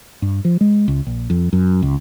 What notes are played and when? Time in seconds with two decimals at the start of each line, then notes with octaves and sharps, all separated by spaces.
0.22 G2
0.45 F3
0.61 G#3
0.88 C#2
1.07 A#1
1.30 F2
1.53 F#2
1.83 C#2